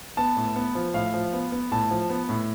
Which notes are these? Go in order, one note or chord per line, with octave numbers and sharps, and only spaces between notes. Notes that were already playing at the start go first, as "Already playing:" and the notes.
B3 A5
A2
B3
F3
A2 F5
F3
B3
B3
A2 A5
F3
B3
A2